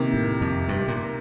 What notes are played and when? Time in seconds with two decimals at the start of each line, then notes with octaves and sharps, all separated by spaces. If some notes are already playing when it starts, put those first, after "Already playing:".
Already playing: C3 D#3 A#3
0.14 A2
0.41 F2
0.69 G2
0.88 A#2